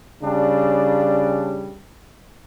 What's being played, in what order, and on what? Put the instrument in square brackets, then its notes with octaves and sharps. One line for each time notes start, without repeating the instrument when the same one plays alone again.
[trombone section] C#3 G3 D4